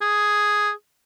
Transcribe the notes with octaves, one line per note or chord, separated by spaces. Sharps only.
G#4